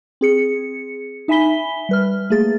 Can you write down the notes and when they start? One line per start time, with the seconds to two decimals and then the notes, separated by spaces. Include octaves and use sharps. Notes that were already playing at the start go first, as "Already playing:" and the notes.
0.21 C4 G#4 C#7
1.28 D#4 E5 G#5 B5 B6 G7
1.89 G3 B4 F6
2.30 A3 A#3 G#4 A6